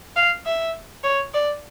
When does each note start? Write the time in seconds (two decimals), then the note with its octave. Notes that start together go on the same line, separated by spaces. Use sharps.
0.16 F5
0.46 E5
1.04 C#5
1.34 D5